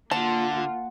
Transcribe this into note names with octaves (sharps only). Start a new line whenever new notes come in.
D3 A#3 F4 F#5 A5